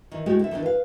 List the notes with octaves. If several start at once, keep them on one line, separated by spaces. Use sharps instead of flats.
D#3 E3
G#3 A3 F#4 G4
D3 E5
D#3 E3 B3 D4
B4 F5